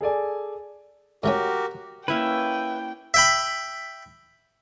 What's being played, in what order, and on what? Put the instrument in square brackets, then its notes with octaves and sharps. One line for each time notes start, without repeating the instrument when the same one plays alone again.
[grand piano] G#4 A4 D5 G#5
[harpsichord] G#2 A3 C#4 [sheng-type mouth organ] F#4 G4 A#4
[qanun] A#3 C#4 E4 [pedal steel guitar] B4 E5 [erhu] G5
[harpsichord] E5 G5 B5